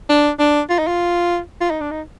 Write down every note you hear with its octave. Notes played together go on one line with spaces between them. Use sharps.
D4
D4
F4
D#4
F4
F4
D#4
D4
D#4